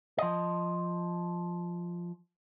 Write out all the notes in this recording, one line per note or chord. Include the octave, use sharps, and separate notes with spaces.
F3 D#5